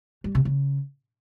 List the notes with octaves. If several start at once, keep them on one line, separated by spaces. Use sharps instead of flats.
G3
C3
C#3